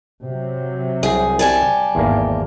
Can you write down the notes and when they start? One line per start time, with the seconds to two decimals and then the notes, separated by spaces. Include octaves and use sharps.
0.23 C3 F#3
1.03 C2 G#4
1.39 G3 G#5 A5
1.95 G#1 E2 A#3